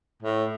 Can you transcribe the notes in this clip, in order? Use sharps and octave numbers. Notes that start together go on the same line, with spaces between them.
A2